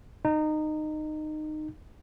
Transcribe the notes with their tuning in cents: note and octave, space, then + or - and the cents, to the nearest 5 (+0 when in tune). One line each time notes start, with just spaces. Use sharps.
D#4 -20